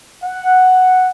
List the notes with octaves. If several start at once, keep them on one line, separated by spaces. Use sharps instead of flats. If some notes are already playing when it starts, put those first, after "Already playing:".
F#5